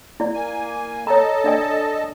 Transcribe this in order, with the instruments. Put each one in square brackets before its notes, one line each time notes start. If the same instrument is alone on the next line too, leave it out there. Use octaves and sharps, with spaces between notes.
[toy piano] E4 D5
[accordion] A#3 G#5
[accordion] A4 D#5 A5 [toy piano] C#5 A#5
[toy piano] D4 D5 G#5